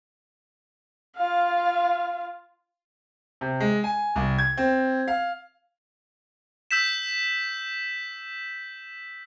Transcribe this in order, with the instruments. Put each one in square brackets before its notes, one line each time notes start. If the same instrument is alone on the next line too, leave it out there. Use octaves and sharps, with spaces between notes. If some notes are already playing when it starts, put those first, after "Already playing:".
[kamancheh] F4 F5
[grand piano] C3
G#3
G#5
C2
G#6
C4
F5
[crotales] E6 G6 B6 E7